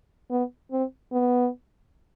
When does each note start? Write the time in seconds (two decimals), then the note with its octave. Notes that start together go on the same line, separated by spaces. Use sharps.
0.31 B3
0.72 C4
1.12 B3